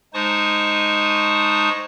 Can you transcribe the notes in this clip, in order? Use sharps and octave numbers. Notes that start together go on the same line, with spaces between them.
G#3 D#4 C5 A5 C#6 D#6